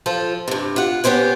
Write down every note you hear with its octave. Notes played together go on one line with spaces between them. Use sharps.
F3 F4 A4
G2 C3
F4 F#5
B3 C#4 G4 C5 C#5